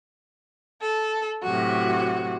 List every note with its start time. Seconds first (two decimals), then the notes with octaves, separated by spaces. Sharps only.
0.82 A4
1.43 A2 C3 F#3 F#4